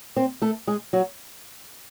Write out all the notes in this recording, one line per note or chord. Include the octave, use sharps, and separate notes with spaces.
C4 C5
A3 A4
G#3 G#4
F#3 F#4